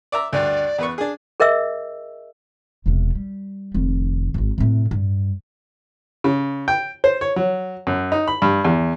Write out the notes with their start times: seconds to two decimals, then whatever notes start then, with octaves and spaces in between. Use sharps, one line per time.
0.12 D5 E5 A#5
0.33 D2 G2 D5
0.78 E2 B4 C#6
0.98 D4 G#4
1.40 G#4 A#4 D#5 E5 E6
2.86 E1 C3
3.15 G3
3.74 F1 D#3
4.34 D1 G#1
4.58 A2 C3
4.91 G2
6.24 C#3
6.68 G5
7.04 C5
7.21 C#5
7.36 F#3
7.87 F#2
8.12 D#4
8.28 B5
8.42 G2
8.65 E2